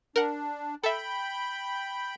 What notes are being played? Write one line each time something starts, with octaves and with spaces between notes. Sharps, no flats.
D4 A#4 F#5
A4 E5 G5 B5 G6